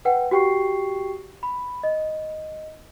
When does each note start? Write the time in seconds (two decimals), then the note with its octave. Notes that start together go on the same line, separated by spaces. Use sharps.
0.05 B4 F#5 G5
0.31 F#4 G4 G5 C#6 C7
1.43 B5
1.83 D#5